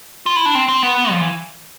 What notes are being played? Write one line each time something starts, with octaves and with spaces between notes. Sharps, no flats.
F4
E4
D4
C4
C4
B3
F3
E3